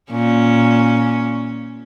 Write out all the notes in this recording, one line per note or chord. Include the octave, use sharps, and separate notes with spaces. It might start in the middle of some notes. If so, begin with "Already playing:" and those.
A#2 C#4